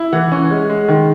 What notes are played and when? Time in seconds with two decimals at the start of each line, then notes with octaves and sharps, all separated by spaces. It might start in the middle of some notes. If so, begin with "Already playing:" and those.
Already playing: E4
0.13 E3 F#5
0.32 C#4
0.51 G#3
0.69 G#3
0.88 D#3